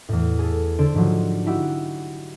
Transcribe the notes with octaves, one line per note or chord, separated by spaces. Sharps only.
E2 A2
G#4 A4
D3 A4 C5 C6 D7
G#2 D3 F3 F#3
D#4 E4 F#4 G4 F#5